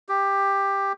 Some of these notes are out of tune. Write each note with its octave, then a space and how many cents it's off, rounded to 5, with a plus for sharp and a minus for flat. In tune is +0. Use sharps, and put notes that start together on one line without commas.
G4 +10